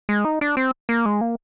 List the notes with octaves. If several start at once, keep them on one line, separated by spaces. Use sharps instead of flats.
G#3
D#4
D4
C4
A#3
G#3
A#3